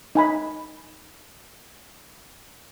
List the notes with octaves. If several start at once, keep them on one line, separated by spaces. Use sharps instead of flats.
D#4 G#5 B5